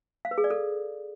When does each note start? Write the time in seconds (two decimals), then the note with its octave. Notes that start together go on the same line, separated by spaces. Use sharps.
0.25 F5
0.31 B4
0.38 G#4
0.44 D5
0.50 A4